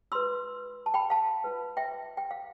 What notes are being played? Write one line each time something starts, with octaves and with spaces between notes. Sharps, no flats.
F4 B4 C6 E6
A5
G5 B5
F5 A5
F4 B4
E5 G5
G5
F5